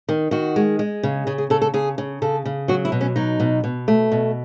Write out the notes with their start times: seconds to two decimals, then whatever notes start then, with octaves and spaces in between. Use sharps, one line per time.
0.09 D#3
0.31 D#3 F#4
0.56 G#3
0.79 G#3
1.03 C#3
1.27 C#3 G#4
1.38 G#4
1.50 C#3 A4
1.61 A4
1.74 C#3 G#4
1.98 C#3
2.22 C#3 A4
2.45 C#3
2.68 F#3 F#4
2.85 E4
2.92 B2
3.01 C#4
3.16 F#3 D#4
3.40 B2
3.64 B2
3.88 A3
4.12 B2